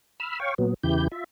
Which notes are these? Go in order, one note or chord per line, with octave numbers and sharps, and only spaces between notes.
B5 E6 F6
C#5 F5 G5 C#6
A#2 F#3 B3
E2 C#3 E3 E4 G4 G6
F4 E5